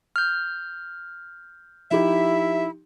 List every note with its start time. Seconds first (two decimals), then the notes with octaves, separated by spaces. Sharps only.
0.16 F6 G6
1.91 F3 D#4 E4 G4 E5